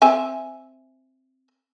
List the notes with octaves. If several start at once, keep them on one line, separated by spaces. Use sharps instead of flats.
C4 E5 G#5